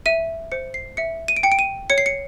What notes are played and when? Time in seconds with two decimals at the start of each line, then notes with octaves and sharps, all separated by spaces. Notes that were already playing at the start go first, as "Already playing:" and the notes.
0.06 E5 D#7
0.52 C5 C#7
0.74 C7
0.97 E5 C#7
1.28 D#7
1.37 D7
1.43 G5 C#7
1.52 D7
1.59 D#7
1.90 C#5 C#7
1.98 C7
2.06 C#7